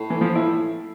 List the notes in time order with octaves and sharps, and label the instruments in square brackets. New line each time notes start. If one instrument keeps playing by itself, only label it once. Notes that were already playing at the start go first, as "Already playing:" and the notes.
Already playing: [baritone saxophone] A2
[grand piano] E3
F3
E4